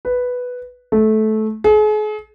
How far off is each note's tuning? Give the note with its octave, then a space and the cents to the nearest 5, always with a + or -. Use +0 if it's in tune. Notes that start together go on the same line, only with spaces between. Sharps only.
B4 +0
A3 -20
G#4 +40